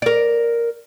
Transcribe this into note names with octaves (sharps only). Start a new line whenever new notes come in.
A#4 D5